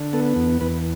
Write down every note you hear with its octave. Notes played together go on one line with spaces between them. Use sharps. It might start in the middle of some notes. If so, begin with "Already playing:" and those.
Already playing: D3
B3 A4
E2
E2 B4